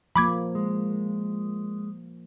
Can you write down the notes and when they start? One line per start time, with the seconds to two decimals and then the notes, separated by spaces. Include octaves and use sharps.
0.16 F3 A#3 B5 D6 G#6
0.55 G#3